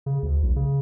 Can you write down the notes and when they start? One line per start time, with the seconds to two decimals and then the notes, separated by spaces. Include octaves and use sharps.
0.06 C#3
0.23 D2
0.42 B1
0.56 C#3